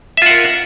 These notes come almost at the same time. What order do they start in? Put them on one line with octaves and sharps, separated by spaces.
E5 F4 F#5 A#4